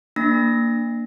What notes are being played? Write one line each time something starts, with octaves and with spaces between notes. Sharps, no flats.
A#3 D4 A#6